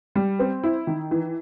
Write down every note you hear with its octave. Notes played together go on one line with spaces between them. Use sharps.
G3
C4
E4
D#3
E3